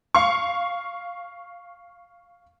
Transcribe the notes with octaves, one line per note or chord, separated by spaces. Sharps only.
F5 C#6